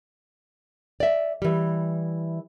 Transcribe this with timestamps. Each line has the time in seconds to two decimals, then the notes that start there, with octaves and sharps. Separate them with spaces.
1.00 D5 E5
1.42 E3 G3